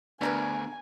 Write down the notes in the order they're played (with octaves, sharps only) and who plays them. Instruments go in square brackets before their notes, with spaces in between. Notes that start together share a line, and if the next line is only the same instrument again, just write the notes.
[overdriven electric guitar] D2 [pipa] G3 A#4 B4 [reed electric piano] B3 D4 [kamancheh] G#5